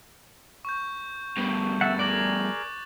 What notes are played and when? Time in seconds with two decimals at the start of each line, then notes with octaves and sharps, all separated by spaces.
0.65 C#6 G6
1.37 G2 B2
1.81 E5 F#5 A6
1.99 G#4 A#4 D5 D6 F#6 F#7